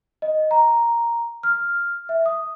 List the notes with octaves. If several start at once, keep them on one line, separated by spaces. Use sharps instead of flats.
D#5
A#5
F6
E5
D#6